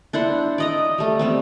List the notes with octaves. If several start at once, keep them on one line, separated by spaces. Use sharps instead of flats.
D4 E4 C5 F#5
D5 D#5 A#5
G3 A3
G3 B3 C4